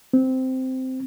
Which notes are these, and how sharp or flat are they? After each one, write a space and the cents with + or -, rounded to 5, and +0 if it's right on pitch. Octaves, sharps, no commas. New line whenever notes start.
C4 -10